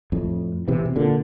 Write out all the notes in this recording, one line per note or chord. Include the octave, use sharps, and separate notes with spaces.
F2 A2
C3 E3
C3
A#2 D3